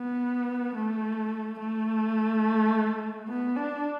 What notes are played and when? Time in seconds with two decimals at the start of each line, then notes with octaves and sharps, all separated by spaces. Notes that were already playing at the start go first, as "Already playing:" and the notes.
Already playing: B3
0.75 A3
1.60 A3
3.29 B3
3.57 D4